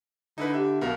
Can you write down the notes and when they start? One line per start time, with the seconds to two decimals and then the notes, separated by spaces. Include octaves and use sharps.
0.38 D3 D#4 E4 B4
0.54 G4 E5
0.81 B1 B2 A#4 F5